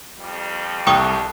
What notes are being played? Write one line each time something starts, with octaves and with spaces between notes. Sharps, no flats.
F2 G3
C2 A4 G5 C#6 D#6